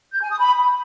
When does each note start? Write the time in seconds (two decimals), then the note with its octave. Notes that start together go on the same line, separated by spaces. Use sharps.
0.12 G6
0.21 G#5
0.30 D#6
0.39 B5